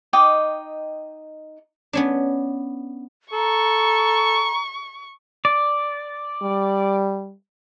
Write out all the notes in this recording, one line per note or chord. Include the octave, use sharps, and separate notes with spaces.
D#4 D#5 G5 D6
B3 C#4 D4
A4 A#5 C#6
D5
G3